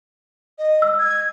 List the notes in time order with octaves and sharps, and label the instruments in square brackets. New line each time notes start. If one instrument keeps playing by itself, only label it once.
[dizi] D#5
[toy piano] E6
[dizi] G#6